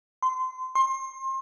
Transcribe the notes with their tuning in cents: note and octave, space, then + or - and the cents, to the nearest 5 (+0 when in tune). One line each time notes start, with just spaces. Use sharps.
C6 -25
C6 +25